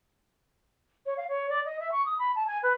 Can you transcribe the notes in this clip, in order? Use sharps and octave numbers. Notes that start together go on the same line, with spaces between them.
C#5
F5
C#5
D5
D#5
E5
C#6
D#6
B5
A5
G#5
B4